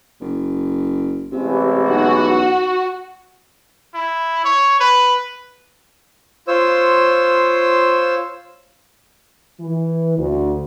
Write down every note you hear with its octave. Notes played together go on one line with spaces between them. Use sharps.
F#1
A1 C3 E3 G#3
B1 F#4
E4
C#5
B4
F4 C5 C#5 E6
E3
D2